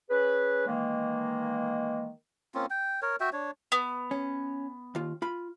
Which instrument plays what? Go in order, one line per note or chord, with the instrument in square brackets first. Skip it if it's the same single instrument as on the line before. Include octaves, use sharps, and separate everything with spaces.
[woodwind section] C#4 G#4 B4
D#3 E3 G#3 A#3
[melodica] A#3 C4 C#4 F4
G5
A#4 C#5
F#4 E5 G5
D4 C#5
[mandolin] B3
[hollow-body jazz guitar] C#4
D#2 F4
F4 B5